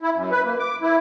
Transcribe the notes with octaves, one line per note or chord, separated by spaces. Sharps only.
E4
F#2
B4
A#3
D6
E4